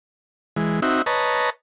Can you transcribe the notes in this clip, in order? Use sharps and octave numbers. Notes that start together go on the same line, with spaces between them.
E3 G#3
C4 D#4 F#4 E5
B4 C#5 D#5 A5 A#5